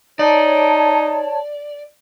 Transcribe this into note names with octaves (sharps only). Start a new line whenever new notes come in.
D#4 C#5 D5 A5